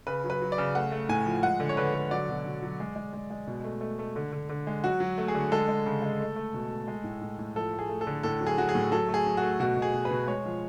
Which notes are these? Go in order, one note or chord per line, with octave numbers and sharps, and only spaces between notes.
C#3 B4
F#3
B4
F#3
D5
C#3
A3 F#5
A3
A2 G#5
F3
G#3 F#5
D3
C#5
D3 B4
D3
F#3 D5
B2
B2
F#3
G#3
G#3
G#3
G#3
B2
A3
A3
A3
D3
D3
D3
G#3
F#3 F#4
F#3
A3
G#4
D3
G#3 A4
G#3
C#3
G#3
A3
A3
B2
A3
G#3
A2
A2
A2
F3 A4
A3
G#4
A3
A4
D3
A2 A4
F#3
G#4
F#3 F#4
G#4
A2
F#3 A4
A3
G#4
F#3
A3 F#4
B2 F#4
B2
G#4
B2
B4
B2
G#3 C#5
F3